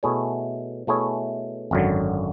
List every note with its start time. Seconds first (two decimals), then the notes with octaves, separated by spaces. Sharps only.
0.03 B2 A3 E4 G#4 C#5
0.87 B2 A3 E4 G#4 C#5
1.71 G#1 F#2 D3 F#3